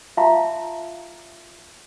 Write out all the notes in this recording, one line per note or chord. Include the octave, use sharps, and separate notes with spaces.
F4 E5 F5 A5 A#5 C6